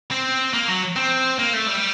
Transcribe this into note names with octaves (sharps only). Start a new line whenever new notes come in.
C4
A#3
F#3
C4
A#3
A3
G3